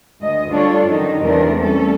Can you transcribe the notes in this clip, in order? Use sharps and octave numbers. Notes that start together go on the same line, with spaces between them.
D2 D#5
G3 D4 F4 A4 C#5
F#2 D3 D#3 D#4
E2 C3 G3 A3 D4 A#4
G3 A3 C#4 A4